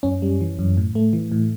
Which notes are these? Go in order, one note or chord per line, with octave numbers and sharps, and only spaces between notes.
F#2 C#4
G3
E3
F#2
A2
A3
E3
A2